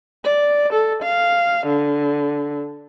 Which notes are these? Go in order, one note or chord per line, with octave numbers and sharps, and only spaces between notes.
D5
A4
F5
D3